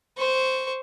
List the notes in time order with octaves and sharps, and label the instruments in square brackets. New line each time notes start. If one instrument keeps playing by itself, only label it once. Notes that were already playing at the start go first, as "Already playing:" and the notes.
[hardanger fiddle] C5 C#6